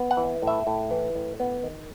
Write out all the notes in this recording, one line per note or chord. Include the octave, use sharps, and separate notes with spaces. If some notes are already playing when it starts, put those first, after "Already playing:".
Already playing: B3
F#5
E3
A2
E5
A2
E3
A2
B3
D#3